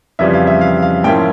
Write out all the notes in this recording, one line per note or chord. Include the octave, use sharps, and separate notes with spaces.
F2 C#3 E3 G3 E5
F5
E5
F5
F5
G#2 F3 A#3 C#4 E4 G5